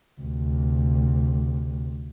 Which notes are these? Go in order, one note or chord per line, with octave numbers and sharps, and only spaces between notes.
D2 C3